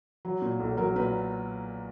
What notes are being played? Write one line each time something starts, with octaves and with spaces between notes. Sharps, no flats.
F#3
A#2
B1
F#3 A#4
A#2 B4